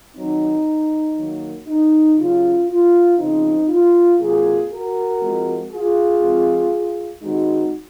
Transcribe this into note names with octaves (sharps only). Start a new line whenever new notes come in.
D#3 F#3 C4 D#4
D#3 F#3 A#3
D#4
C#3 F#3 C#4 F4
F4
C#3 F3 C4 D#4
F4
C3 F#3 A#3 F4 G#4
F#4 A#4
F3 G#3 C4
F4 G#4
F3 G#3 C4
D#3 G#3 C4 D#4 F#4